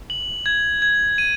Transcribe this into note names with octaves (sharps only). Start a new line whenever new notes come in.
F#7
G#6
G#6
D#7